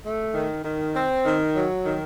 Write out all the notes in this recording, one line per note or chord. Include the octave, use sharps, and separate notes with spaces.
A3
D#3
D#3
C4
D#3
F#3
D#3